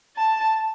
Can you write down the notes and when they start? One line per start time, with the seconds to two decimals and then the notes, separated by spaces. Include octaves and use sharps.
0.17 A5